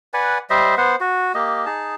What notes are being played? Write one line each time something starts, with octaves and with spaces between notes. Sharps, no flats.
B4 D5 F#5 G#5
G3 C5 D#5 E5
B3 C5 F#5
F#4
A#3 G4 D#5
D#4 G#4 A5